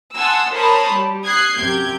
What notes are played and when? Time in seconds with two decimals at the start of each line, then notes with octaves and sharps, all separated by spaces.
0.15 F#5 G#5 A5 C6 D#6 E6
0.54 A#4 C5 C#5 A5 B5 D#6
0.93 G3
1.25 D#6 F#6 G#6 C7
1.58 F#2 C3 G4 G6 G#6